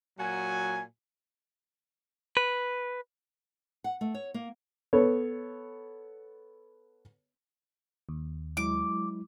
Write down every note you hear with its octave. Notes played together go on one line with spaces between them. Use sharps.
A#2 F#3 F#4 G#5
B4
F#5
A3
C#5
A#3
B3 A4 C#5
D#2
F#3 G#3 E4 D6